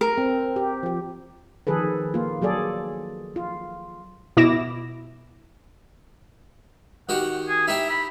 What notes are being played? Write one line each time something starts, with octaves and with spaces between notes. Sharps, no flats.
A#4
C4
G4
F3 G4
D#3 F3 G#4 A4 B4
A#3 F4
F#3 G#4 A4 D5
F4
B2 E4 D6 A#6 E7
D#3 F#4 G4 F#5
G#4
D#4 E4 G4 E5
B5